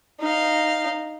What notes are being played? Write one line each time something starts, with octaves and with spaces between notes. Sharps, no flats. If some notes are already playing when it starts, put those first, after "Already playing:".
D#4 F5